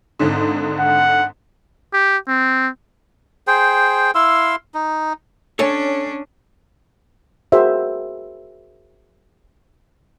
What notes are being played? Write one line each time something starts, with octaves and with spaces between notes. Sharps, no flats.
G#1 G#2 D3
F#5
G4
C4
G#4 C5 G5
E4 F5 C6 E6
D#4
C#4 D4 A4 C#5 G#5
F#4 G#4 A#4 C5 E5